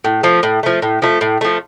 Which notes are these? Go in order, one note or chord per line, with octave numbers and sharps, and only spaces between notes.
A2
F3 A3
A2
F3 A3
A2
F3 A3
A2
F3 A3